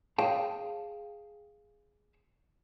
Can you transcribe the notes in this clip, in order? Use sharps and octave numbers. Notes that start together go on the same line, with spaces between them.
G#4 C#5 F5 G5 A5